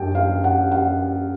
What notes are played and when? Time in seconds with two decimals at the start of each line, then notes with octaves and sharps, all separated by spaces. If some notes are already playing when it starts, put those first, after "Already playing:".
Already playing: F#2 D4 G5
0.15 F5
0.44 F#5
0.71 F#5